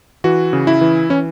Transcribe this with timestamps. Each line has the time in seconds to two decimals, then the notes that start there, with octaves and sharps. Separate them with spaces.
0.24 E3 F#4
0.53 C#3
0.67 E4
0.81 E3
1.10 E3 C#4